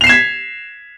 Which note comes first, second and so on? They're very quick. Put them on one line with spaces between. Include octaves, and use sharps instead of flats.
F7 C7 E7 G#6 B6